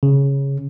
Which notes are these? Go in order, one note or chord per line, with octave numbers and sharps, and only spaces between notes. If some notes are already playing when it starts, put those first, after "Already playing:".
C#3